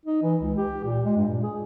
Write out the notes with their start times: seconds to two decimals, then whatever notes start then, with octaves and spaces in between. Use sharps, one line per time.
0.06 D#4
0.23 E3
0.41 C#2
0.57 G4
0.84 A#2
1.05 G#3
1.17 G2
1.31 A#2
1.43 G#4